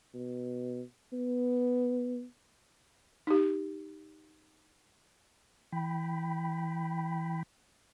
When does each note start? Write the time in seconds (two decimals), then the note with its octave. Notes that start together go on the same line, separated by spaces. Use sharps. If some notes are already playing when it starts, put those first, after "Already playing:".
0.14 B2
1.13 B3
3.27 D#4 G4
5.72 E3 G5 B5